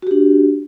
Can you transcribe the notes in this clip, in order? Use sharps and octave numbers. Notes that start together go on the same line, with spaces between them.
D4 F#4 G4